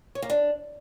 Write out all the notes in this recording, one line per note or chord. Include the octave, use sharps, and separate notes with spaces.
C#5
A#3
D4